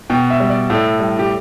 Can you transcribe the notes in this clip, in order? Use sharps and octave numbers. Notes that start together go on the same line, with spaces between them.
B2 G5
E5
G3
D5
A2 A4
G3
G4